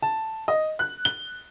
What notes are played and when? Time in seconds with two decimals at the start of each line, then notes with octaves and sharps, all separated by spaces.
0.02 A5
0.48 D#5
0.79 F#6
1.05 G7